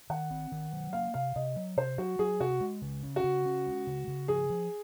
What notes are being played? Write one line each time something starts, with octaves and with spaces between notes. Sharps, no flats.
D#3 F#5
C4
D#3
F#3
A#3 F5
C3 F5
C3 D#5
F#3
C3 C5
F#3 F#4
F#3 G#4
C3 F#4
G#3
C#3
C#4
F#4
C#3
C#4
G#3
C#3
C#3
F3 G#4
F3